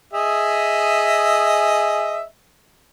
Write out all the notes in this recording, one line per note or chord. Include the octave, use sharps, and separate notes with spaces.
G#4 D#5 E5